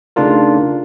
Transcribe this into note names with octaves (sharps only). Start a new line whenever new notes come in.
C#3 A3 D4 D#4 F4 A#4